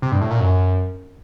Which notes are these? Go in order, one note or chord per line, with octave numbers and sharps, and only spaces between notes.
C3
G2
A2
A#2
F#2